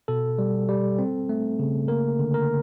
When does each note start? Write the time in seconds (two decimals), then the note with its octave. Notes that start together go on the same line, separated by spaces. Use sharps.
0.08 B2 A4
0.38 G3
0.68 G3
0.99 C4
1.29 A3
1.59 C#3
1.88 A#3 A#4
2.19 D3
2.34 A#4